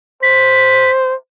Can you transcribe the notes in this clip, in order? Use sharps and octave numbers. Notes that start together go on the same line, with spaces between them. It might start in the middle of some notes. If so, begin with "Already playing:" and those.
C5 B6